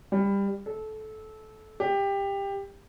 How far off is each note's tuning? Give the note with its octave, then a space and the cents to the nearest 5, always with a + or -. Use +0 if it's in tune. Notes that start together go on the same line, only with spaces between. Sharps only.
G3 +20
A4 -20
G4 +15